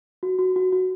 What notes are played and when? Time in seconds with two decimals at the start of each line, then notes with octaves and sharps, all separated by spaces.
0.23 F#4
0.39 F#4
0.56 F#4
0.72 F#4